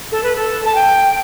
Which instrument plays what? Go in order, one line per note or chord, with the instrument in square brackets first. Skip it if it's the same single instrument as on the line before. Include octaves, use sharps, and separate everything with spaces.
[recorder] A4
B4
A4
A5
G5